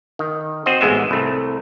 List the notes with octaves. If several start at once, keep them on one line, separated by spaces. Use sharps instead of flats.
D#3
C4 F#4 C5 D#5
A1 G#2 G#3 B3 E5
C2 A3